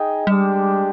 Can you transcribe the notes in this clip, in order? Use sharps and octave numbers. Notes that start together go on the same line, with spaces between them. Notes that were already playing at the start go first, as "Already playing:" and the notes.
Already playing: D#4 G#4 D#5 G5
G3 G#3 D4 G4